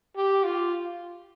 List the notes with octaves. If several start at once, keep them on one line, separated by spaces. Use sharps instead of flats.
G4
F4